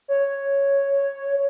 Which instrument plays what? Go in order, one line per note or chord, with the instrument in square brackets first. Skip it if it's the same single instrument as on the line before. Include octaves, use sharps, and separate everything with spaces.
[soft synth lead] C#5